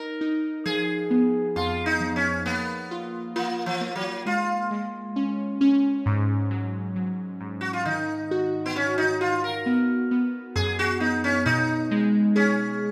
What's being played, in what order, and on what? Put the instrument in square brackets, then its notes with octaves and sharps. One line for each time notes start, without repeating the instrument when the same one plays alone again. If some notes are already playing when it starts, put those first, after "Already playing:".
Already playing: [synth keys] D#4 [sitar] A#4
[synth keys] D#4
[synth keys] F3 [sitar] G#4
[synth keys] B3
[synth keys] F2 [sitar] F4
[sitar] D#4
[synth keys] F3
[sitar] C#4
[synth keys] A#3 [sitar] B3
[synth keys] F4
[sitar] A#3 [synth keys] F4
[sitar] F3
[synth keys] A#3
[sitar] F#3
[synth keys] G#3 [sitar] F4
[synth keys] G#3
C#4
C#4
G#2
F#3
F#3
G#2
[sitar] F#4
F4
[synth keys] D#3 [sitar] D#4
[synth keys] F#4
[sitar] B3
[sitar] C#4 [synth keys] F#4
[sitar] D#4
[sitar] F4 [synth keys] F#4
[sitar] A#4
[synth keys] B3
B3
[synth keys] F#2 [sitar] G#4
[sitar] F#4
[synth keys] B3 [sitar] D#4
[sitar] C#4
[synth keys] B2 [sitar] D#4
[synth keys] G#3
[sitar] C#4 [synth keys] G#4